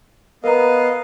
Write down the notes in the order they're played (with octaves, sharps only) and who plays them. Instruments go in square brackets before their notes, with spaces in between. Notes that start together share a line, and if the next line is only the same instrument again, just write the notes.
[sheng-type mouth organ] B3 D#5 F5 [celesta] A#4 B4 A#5